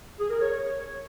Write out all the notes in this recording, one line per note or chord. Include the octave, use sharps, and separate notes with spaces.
G#4
A#4
C#5
C#5